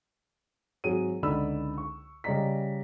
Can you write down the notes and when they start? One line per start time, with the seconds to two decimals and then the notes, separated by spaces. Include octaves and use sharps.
0.84 G#1 F#3 G#4 C#5 D#7
1.23 C#2 D3 D#4 D5 B5 E6
1.78 C#6
2.24 C#3 G3 D5 D#5 A#5 B6